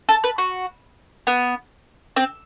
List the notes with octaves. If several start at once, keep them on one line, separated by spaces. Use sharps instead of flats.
A4
B4
F#4
B3
C4